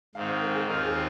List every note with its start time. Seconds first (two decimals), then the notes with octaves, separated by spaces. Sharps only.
0.15 G#2 D#3 C4 F5
0.28 C5
0.41 A#4
0.54 G#4
0.67 D#2 D#3 C4 F4 A#4
0.85 G#4